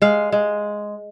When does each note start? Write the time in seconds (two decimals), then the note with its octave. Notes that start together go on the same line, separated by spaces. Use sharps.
0.02 G#3 F5
0.32 G#3